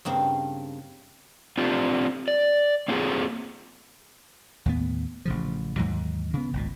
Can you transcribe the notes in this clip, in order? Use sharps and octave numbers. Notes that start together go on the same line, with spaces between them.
G2 C#3 A#3 C4
C4 D4 F4 G4
D5
A#3 C4 F4 F#4 G#4
D#2 A2 B3
A1 C#3 F3
D#2 G#2 E3 F#3
C#3 B3
G#1 C#2 A#2